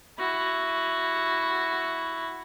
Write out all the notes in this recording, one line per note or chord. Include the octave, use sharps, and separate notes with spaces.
E4 F#4